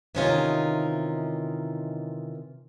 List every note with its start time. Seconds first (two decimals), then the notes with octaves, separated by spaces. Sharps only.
0.15 C3 D#3 E3 C#4 D#4 F4